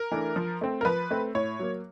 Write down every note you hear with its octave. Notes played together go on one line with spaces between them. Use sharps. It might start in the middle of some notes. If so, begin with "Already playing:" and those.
Already playing: A#4
E3 A3 D4
F3
A3 C4
A#4
F3 B4
A3 C4
A2 C#5
F#3 A#3